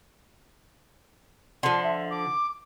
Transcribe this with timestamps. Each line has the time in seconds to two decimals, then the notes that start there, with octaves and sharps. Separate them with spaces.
1.63 D3 F3 C6
1.84 E5
2.10 D6